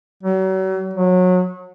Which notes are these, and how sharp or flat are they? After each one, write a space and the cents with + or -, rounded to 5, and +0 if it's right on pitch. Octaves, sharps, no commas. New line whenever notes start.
F#3 +40
F#3 -25